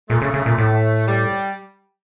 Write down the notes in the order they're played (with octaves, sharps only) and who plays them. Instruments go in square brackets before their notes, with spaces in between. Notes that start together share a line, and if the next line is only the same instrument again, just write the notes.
[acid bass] A#2 [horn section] A3
[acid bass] C#3
C#3
A#2
A2
[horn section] G3